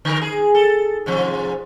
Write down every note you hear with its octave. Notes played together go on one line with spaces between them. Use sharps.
D3 A#4
G#4
A4
G#2 C3 F3